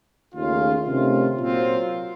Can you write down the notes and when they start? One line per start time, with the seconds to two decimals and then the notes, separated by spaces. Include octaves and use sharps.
0.34 D#2 C#3 A3 C#4 F4
0.86 C3 D#3 A3 C#4 F4
1.37 A#2 F#3 C4 F4